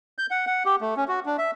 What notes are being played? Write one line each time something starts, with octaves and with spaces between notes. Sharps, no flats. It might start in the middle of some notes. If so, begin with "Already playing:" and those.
G6
F#5
F#5
G4
A3
C#4
F#4
D4
E5